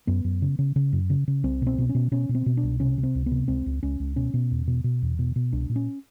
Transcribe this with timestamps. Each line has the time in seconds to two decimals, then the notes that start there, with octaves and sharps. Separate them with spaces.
0.07 F#2 B3
0.24 F#2
0.42 C#3
0.59 C#3
0.76 C#3
0.93 F#2
1.10 C#3
1.28 C#3
1.44 C2 C4
1.62 B2 C4
1.78 B2
1.89 C#4
1.95 B2
2.11 B2 C#4
2.29 B2
2.35 C4
2.46 B2
2.57 D4
2.63 C2
2.80 C3 C#4
2.98 C3
3.03 C4
3.15 C#2
3.26 B3
3.31 C3
3.48 C#2 C4
3.66 C#2
3.83 C#2 C#4
4.00 C#2
4.16 B2 C#4
4.34 B2
4.51 E2
4.67 B2
4.84 B2
5.02 E2
5.19 B2
5.36 B2
5.53 C2 D4
5.69 A#2
5.76 C#4